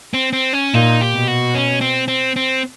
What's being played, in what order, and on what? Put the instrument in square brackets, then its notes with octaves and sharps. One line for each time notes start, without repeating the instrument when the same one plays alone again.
[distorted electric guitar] C4
C4
C#4
[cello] A#2 [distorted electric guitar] D#4
[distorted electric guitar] G4
[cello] B2
[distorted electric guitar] F#4
C#4
C4
C4
C4